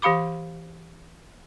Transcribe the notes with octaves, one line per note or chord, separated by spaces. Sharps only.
E3 G4 F5 B5 D6